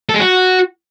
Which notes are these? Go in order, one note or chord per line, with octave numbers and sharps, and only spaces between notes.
A4
G#3
F#4